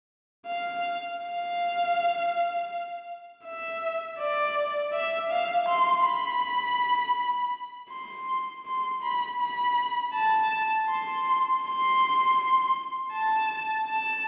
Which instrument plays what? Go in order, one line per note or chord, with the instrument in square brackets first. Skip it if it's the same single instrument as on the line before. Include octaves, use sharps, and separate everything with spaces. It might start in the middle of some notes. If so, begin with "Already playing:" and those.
[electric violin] F5
F5
E5
D5
E5
F5
C6
B5
C6
C6
B5
B5
A5
C6
C6
A5
A5